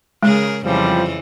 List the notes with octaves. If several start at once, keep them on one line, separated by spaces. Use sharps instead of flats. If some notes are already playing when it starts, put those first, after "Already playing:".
C#3 G#3 G#4 A#4
F2 C#3 E3 F3 G3